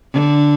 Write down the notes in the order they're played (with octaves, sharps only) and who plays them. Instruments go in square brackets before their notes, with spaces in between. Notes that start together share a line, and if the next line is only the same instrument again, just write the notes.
[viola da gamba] D3